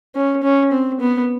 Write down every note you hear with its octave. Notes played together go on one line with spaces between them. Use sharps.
C#4
C#4
C4
B3